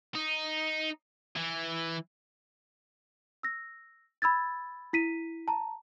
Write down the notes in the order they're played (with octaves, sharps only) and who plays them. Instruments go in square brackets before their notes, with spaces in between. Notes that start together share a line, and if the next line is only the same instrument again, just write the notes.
[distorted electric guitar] D#4
E3
[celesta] E6 A#6
B5 E6 G#6 A6
E4 B6 D#7
A5 A#5